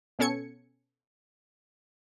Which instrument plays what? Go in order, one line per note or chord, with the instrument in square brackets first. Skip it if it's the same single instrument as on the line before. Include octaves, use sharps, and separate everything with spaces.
[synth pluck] B2 B3 C#4 A4 G#6 C#7